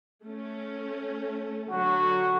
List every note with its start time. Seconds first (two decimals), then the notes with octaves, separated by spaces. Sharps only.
0.23 A3 C#4
1.71 D3 F#3 F#4